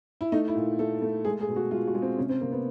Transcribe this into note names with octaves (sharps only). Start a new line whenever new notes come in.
E4
A3 D#4
E4
A#2
A3 A4
A3
G#3 G#4
G#4
B2
F#4
G#3 F4
F#4
G#3
C4
C3 C#4
C4
C3 A#3
B3